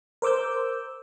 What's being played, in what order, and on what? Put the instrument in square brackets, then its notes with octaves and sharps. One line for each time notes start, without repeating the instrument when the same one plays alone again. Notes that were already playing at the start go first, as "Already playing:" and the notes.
[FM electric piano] A#4 C5 D6 E6 G6